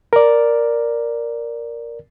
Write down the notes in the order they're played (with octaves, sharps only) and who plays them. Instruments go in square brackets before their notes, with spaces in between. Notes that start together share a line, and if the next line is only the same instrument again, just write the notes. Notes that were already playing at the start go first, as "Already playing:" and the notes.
[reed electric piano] A#4 D5